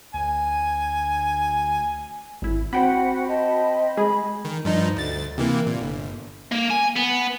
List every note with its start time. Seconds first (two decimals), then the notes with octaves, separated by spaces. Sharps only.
0.14 D2 G#5
2.42 G#1 E4
2.73 C4 F#4 C5 F#5 G5 B5
3.28 D#5 A5
3.97 G#3 G#4 B5
4.45 D#3
4.65 G2 F3 D#4
4.96 D2 A6
5.38 C3 E3 A#3
5.66 A#2
5.80 G1
6.52 A#3
6.71 G#5
6.96 B3